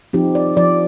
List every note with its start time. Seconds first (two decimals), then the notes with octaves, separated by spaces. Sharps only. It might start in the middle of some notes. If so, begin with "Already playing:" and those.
0.13 F3 C4 D#4 G4
0.35 D5
0.57 F3 D5